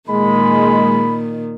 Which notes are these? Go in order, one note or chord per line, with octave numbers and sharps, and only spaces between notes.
A#2 D#3 G#3 B5